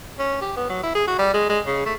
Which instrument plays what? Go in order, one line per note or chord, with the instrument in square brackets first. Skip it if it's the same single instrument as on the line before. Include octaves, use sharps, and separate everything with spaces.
[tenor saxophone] C#4
G4
B3
F#3
E4
G#4
F#4
G3
G#3
G#3
C#3
A3